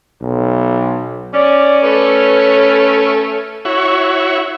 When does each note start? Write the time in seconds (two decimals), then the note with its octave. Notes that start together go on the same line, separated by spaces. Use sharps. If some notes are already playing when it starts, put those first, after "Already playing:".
0.21 B1
1.34 C#4 D5
1.83 A3 B4
3.65 E4 F#4 C#5